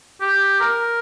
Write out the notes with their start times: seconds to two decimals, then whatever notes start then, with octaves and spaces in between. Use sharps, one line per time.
0.21 G4
0.60 A#4